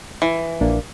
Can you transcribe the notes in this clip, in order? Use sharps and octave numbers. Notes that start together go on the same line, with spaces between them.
E3
A#1 A#3 D4